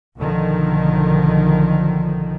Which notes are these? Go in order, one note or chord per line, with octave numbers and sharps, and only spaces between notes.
B1 D3 D#3 F3